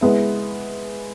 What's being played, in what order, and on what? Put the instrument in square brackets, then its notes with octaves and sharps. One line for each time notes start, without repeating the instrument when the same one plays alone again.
[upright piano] G#3 B3 E4